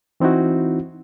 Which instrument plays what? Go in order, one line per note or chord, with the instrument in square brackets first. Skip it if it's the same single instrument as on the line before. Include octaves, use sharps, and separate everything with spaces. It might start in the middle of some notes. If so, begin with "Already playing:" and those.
[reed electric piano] E3 C4 D#4 E4 F#4